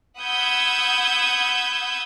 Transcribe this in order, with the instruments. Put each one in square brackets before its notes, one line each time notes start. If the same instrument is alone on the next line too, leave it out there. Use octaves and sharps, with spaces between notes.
[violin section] F#5 B5 D#6 E6 G6 G#6